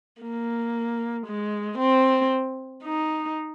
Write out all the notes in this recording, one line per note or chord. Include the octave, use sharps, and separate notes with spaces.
A#3
G#3
C4
D#4